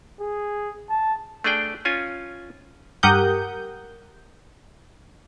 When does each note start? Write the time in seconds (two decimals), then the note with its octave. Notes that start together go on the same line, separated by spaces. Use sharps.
0.21 G#4
0.90 A5
1.44 A3 D4 G#4 D5 G5
1.85 C#4 F4 G#5
3.03 G2 G4 A#4 F#5 D#6 G6